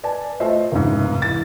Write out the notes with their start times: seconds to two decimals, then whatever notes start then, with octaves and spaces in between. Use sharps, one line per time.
0.04 B4 D5 G#5 A5
0.40 A3 F4 C5 D#5 E5
0.72 F1 C#2 G#2
1.22 E3 A6